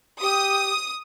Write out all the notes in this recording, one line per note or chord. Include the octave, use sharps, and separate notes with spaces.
G4 D#6